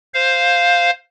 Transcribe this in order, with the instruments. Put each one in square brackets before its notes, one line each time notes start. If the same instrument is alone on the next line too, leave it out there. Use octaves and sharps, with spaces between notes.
[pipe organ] C5 F5